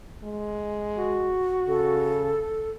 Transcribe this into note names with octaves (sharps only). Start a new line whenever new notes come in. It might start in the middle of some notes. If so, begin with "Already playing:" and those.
G#3
F#4
C#3 A4